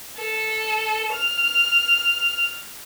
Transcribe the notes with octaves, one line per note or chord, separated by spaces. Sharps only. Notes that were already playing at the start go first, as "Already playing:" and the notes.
A4
F6